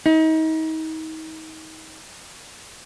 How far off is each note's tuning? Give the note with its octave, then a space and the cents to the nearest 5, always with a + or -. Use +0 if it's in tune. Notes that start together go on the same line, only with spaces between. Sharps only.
D#4 +35